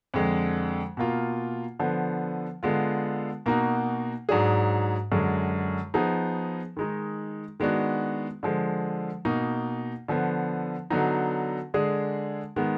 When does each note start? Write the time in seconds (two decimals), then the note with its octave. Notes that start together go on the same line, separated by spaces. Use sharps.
0.14 F2 D3 G#3
0.97 B2 A#3 F4
1.80 D3 F3 B3
2.63 D3 G#3 B3 F4
3.46 B2 A#3 D#4 F#4
4.29 G#2 F#3 D4 G#4
5.11 F#2 D3 G#3
5.94 F3 B3 D#4 G#4
6.77 D#3 G#3 D#4
7.60 D#3 G#3 B3 D4 F#4
8.43 D3 F3 G#3
9.25 B2 A#3 D#4
10.08 D3 F3 B3
10.90 D3 F#3 B3 D#4
11.74 D3 G#3 D4 G#4
12.56 D#3 G#3 B3